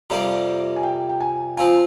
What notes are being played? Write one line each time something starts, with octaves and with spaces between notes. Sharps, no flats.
F2 C3 G3 A#3 A#5
G#5
G5
G5
G#5
F3 C4 F4 G#5